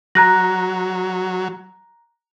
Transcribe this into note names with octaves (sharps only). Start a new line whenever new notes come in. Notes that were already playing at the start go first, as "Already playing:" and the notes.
F#3 A#5 F#6 A#6